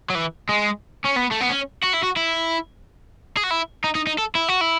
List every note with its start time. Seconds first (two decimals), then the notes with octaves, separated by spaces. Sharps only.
0.10 F#3
0.15 E3
0.49 G#3
1.04 C#4
1.16 B3
1.31 A3
1.40 B3
1.50 C#4
1.83 F#4
1.93 E4
2.03 F#4
2.16 E4
3.37 G#4
3.43 F#4
3.50 E4
3.84 D#4
3.95 D#4
4.07 D#4
4.18 A4
4.35 E4
4.48 F#4
4.61 E4